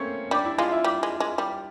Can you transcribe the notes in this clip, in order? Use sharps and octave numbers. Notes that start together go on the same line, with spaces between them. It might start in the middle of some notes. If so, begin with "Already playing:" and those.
Already playing: A3 A#3 C4 C#4 C#5
G3 D4 D5
E4 E5
G#3 F4 F5
E4 E5
G3
G#3
G#3
G3